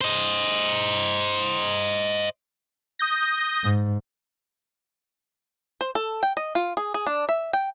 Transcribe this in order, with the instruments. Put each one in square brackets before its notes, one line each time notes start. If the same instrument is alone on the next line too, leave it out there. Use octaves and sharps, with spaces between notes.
[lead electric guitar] C5 D#5
[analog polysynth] D#6 G6 A#6
[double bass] G#2
[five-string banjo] C5
A4
G5
D#5
F4
G#4
G#4
D4
E5
G5